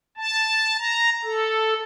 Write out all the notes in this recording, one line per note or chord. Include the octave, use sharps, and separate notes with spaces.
A5
A#5
A4